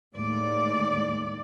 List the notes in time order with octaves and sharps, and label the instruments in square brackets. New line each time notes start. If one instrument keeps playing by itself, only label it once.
[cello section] D#2 A2 G#3 D5